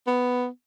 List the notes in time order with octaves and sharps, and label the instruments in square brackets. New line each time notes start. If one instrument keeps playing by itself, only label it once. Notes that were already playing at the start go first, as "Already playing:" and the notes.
[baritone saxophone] B3